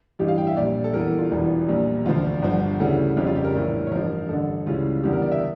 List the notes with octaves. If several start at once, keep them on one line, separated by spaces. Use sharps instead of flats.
A1 G2 E3 G3 G4
F5
G5
E5
A#1 A#2 G3 D5
A4
E2 E3 G3 A#4
A4
G4
F4
E1 E2 E3 G3
A#1 A#2 G3
E1 D2 D3 F3 F4
G1 G2 D3 F3
D2 C#3 E3 G3 A4
F1 F2 C#3 G3 G4
F4
G4
A#4
A#1 A2 E3 G3
C#5
A1 G2 F3 A#4
A1 G2 D3 A4
C#2 C#3 E3 G3 F4
E2 D3 G3 G4
A#4
D5
E5